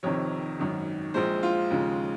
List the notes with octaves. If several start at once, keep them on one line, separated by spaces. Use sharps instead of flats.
F1 F2 C3 D#3 C#5
G#1 F#2 D#3
A#1 A#2 G#3 C5
F4
D#2 C#3 F3 G#3